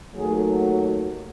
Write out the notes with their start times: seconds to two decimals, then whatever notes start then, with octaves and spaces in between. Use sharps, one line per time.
0.15 D#2 D#3 F#3 A3 G#4
0.63 F#4